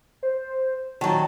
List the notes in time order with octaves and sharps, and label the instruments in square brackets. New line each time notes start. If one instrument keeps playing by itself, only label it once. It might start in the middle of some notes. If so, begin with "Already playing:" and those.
[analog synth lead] C5
[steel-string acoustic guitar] D#3 F#3 [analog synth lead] A5